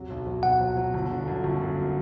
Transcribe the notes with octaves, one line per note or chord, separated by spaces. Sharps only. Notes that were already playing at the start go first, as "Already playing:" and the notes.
Already playing: C3 F#3
B1
F#3
B1 F#5
F#3
F#3
G1
D3
F#2
G1
F#2